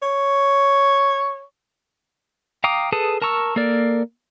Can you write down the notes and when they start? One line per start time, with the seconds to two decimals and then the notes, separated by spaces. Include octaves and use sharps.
0.02 C#5
2.64 F5 G5 A#5 D6 D#6
2.92 G#4 A4 B4 A5 D#6
3.22 A#4 A5 A#5 C#6 E6
3.56 A#3 A4 A#4 D5